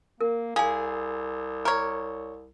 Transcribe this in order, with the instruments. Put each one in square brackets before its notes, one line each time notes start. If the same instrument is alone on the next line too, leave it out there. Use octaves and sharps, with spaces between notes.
[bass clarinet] A#3 [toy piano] A#4
[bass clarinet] C2 [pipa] G#4 [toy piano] F5 G#5
[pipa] A#4 C#5